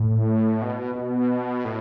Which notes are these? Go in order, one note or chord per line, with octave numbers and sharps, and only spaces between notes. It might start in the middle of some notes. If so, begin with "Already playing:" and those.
Already playing: A2
B2
B2
A2